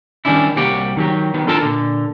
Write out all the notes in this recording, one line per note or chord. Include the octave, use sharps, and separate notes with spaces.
D#3 F#3 G3 C#4 D4 E4
C2 G3 A#3 F#4 G4 G5
D#3 F#3 G4
D#3 B3
D4 F4 A4 A#4 A5 A#5
A#2 D3